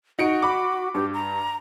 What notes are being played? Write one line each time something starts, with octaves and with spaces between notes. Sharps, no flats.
D#4 F#4 C#7 D7
B5 D6
G2 G4
A#5